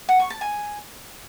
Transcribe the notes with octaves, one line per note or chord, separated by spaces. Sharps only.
F#5
C#6
A5
G#5